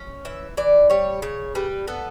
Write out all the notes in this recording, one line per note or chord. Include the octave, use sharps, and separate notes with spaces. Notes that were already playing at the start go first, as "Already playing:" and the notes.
Already playing: C#4
E3 E5
E3 D5
G3 C#5
C#3 C#5
G3 B4
B3 A4